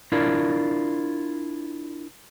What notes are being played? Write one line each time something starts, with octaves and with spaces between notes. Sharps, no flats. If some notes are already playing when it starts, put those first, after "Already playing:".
D4 E4 F4 A#4 D5